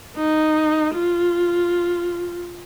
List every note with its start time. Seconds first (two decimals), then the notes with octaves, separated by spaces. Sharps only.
0.16 D#4
0.94 F4